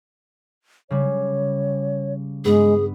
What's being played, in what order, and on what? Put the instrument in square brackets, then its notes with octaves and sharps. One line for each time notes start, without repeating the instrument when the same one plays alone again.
[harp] C#3 G3 [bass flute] C#5
[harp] G2 B3 [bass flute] G#3 [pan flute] G#4